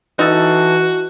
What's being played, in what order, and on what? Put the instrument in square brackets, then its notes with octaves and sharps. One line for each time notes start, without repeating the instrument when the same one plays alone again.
[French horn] E3 [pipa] D#4 A4 [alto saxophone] F#4